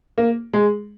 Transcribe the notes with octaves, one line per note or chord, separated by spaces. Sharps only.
A#3
G#3